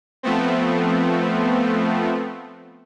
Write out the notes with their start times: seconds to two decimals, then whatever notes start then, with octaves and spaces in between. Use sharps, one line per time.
0.23 F3 A3 B3 C4